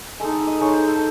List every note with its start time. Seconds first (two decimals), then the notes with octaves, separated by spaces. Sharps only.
0.20 G#3 D#4 A4
0.47 D#5
0.61 G#3 D#4 C#5
0.73 C5
0.87 A4